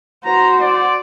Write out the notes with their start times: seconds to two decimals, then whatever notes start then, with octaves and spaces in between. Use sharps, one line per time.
0.25 F#4 C5 A#5
0.60 D5